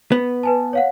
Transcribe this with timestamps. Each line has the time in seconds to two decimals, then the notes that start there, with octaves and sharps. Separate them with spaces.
0.12 B3
0.43 B4 G#5 A5
0.73 C#5 F5 F#5